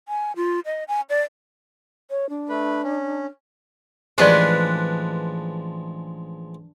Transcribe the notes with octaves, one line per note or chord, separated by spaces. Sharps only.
G#5
F4
D#5
G#5
D5
C#5
D4
A3 B4
C#4
A1 F3 G#3 D4 G4 B4 D5